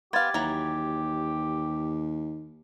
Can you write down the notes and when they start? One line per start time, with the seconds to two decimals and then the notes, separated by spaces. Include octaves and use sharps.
0.13 B3 G4 F5 C6 G#6 A6
0.34 D#2 E3 F#3 A#5